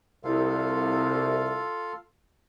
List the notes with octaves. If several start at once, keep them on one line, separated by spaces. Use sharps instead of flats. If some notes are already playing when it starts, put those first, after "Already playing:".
C2 F4 A4 F5